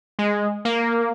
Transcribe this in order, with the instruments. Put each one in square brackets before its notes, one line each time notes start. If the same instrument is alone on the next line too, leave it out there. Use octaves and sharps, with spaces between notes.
[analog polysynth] G#3
A#3